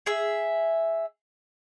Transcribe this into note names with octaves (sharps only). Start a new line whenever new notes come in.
G#4 E5